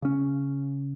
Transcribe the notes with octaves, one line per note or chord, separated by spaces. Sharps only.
C#3 C#4